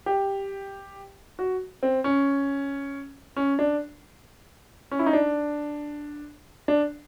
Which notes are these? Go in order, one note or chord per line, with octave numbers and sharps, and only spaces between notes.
G4
F#4
C4
C#4
C#4
D4
C#4
E4
D#4
D4
D4